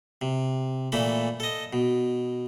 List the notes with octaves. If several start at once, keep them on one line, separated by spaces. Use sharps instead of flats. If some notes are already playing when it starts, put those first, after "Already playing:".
C3
A#2 E3 A3 A4 B5
A4 D#5
B2